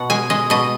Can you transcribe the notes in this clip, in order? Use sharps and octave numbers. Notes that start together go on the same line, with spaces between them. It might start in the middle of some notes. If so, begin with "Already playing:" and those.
Already playing: B2 F#5
G#3 G#5
G#3 D#5
B2 D#5